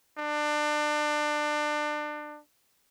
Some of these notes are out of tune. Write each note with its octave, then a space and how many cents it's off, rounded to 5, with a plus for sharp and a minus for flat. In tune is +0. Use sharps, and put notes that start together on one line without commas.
D4 +30